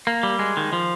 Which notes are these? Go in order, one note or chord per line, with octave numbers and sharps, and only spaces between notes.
A#3
G3
G#3
D#3
F3